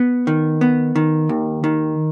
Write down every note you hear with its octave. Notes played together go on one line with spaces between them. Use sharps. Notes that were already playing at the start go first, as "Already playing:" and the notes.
Already playing: B3
D#3
B3
D#3
D#2
D#3